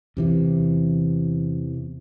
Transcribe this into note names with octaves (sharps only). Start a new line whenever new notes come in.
E2 C3 E3